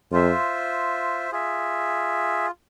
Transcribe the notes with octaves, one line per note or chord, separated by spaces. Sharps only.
F2 F4 C5 E5
F4 G#4 E5